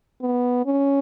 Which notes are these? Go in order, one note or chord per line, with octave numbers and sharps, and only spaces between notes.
B3
C#4